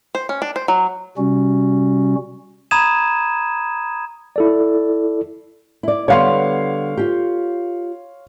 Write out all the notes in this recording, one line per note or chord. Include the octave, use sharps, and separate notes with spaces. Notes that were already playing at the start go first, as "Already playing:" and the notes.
C5
C#4
D4
C5
F#3
C3 G3 C#4 F#4
A#5 B5 D#6 G#6 D#7 E7
E4 A4 D5
E4 D5
D3 G3 B3 C#5 F5 C6
F4 G4